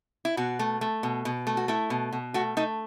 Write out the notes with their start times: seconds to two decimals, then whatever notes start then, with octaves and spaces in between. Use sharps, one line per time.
0.25 E4
0.37 B2 F#4
0.59 A3
0.81 A3
1.03 B2
1.25 B2
1.47 A3
1.57 F#4
1.68 A3 E4
1.90 B2
2.13 B2
2.34 A3 F#4
2.57 A3 D#4